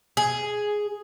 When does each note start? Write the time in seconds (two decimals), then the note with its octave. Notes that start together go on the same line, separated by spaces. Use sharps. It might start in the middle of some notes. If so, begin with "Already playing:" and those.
0.17 G#4